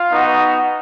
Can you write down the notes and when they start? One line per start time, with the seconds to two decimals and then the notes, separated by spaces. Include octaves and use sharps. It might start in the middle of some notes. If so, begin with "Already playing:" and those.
Already playing: F4 F5
0.11 B3 D#4 F#4